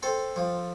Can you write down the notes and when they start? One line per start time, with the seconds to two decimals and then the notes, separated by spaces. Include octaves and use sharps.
0.03 C4 A4
0.36 F3